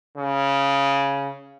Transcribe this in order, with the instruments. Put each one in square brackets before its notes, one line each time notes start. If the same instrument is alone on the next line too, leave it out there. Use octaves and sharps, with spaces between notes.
[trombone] C#3